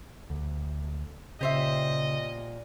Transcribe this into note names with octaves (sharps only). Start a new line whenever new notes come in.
D2
A#2 C#3 G4 C5 D#5 E5